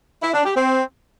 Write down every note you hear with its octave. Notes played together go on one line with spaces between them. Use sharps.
E4
D4
G4
C4